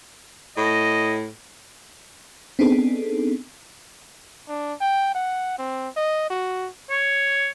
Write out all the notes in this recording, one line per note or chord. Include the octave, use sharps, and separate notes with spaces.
A2 D#5
B3 C4 D4 D#4 G#4 A4
D4
G5
F#5
C4
D#5
F#4
C#5